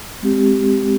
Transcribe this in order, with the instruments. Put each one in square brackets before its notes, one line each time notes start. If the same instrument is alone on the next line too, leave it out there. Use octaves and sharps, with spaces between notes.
[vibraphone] G#3 C4 G4